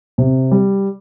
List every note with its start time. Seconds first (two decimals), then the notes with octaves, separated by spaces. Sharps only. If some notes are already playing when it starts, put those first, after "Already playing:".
0.18 C3
0.51 G3